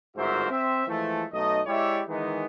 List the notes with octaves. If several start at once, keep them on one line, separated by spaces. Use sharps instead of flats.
G1 G#2 F#4 A#4 C5 E5
C4 E5
E3 F3 G#3 A3
B1 A3 D#4 D#5
G#3 E4 G4 C#5 D5 E5
D#3 E3 G#3 B3 D#4